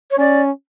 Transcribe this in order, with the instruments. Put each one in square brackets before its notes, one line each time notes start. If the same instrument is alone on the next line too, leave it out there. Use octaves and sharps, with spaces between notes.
[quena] C#5
[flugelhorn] C#4 [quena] D5